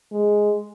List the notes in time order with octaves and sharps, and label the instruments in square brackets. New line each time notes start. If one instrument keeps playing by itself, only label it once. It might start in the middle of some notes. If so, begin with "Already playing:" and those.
[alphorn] G#3